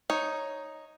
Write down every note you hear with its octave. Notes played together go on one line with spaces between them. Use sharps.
D#4 C#5